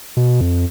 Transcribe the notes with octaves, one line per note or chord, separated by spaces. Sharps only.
B2
F2